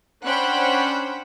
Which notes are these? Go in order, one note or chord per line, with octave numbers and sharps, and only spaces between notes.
C#4 D4 C5 F#5 G5 B5